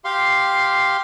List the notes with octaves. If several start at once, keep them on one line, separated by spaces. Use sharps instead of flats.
G4 F5 C6